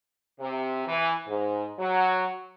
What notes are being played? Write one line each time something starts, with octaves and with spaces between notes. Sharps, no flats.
C3
E3
G#2
F#3